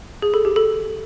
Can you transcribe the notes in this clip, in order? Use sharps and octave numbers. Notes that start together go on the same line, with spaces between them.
G#4
A4
G4
A4